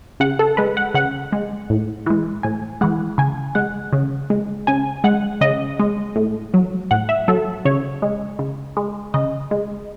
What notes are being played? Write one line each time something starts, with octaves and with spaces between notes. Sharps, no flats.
C#3 F#5
A4
G#3 B4
F#5
C#3 F#5
G#3
A2
E3 G#3
A2 G#5
E3 G#3 F#5
C#3 G#5
G#3 F#5
C#3
G#3
C#3 G#5
G#3 F#5
C#3 D#5
G#3
A2
F#3
A2 F#5
E5
F#3 A4
C#3 C#5
G#3
C#3
G#3
C#3 D#5
G#3